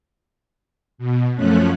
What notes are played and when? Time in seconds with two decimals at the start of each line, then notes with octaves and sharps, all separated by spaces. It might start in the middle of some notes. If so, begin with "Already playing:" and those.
0.98 B2
1.35 F#2 F3 A3 C#4 F#6